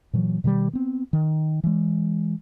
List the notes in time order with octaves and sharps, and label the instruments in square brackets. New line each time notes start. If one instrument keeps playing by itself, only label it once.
[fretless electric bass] A#2 E3 F#3
B2 D#3 E3 G3
B3 C4
D#3
E3 G#3